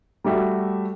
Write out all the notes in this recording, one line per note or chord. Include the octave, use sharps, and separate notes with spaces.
G3 A3 F#4 E5